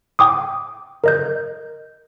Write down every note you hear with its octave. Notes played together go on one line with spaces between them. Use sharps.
G5 D6 D#6
A#4 D#5 G6